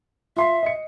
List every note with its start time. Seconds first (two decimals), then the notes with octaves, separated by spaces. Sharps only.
0.37 F4 E5 C6 C7
0.63 D#5 C#7